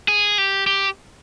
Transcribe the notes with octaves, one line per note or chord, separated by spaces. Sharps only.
G#4
G4
G4